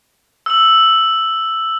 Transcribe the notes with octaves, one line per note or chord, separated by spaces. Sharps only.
E6 F#7